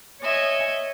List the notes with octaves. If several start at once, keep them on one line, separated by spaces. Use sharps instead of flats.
C#5 D#5 E5 G#5